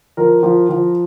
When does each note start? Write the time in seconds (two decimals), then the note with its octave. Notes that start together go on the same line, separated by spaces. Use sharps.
0.17 F3 A#4
0.43 F3
0.69 F3